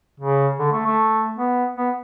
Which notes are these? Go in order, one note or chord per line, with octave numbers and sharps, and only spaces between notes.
C#3
D3
A3
A3
B3
B3